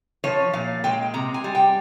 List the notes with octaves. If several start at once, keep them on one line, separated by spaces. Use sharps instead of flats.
F3 C#5
A#2 F5
G#3 G5
C3 A#5
G#5
G3
G5